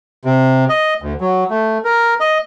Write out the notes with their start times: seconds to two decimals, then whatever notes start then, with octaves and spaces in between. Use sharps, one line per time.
0.25 C3
0.69 D#5
1.02 D2
1.21 F#3
1.50 A3
1.85 A#4
2.20 D#5